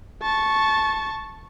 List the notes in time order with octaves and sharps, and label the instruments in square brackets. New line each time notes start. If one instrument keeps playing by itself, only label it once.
[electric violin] A5 C#6